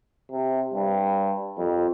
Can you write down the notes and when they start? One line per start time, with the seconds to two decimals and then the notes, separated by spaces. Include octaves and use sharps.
0.32 C3
0.74 G2
1.58 F2